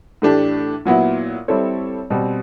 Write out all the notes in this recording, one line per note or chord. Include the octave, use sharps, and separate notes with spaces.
A2 E3 A3 D4 G4
A#2 F#3 B3 E4
G3 C4 E4 A4 C#5
B2 G3 C4